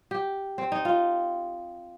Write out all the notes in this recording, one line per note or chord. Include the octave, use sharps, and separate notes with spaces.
G4
C4
D#4
F4